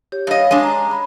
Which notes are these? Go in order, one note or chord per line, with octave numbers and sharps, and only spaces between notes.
G4 C#5
G2 C#5 D#5 F5
G#3 D4
A#5
B5